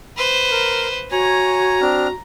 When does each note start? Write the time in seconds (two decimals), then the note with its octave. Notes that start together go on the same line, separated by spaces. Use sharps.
0.17 B4 C5
0.51 A#4
1.12 F#4 C#5 G#5 A#5
1.81 C4 D4 F6